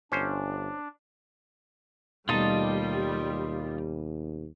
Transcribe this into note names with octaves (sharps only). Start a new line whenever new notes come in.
G1 C#4 D4 C5
D#2 B2 G3 A3 D#4 F4 D#5 A5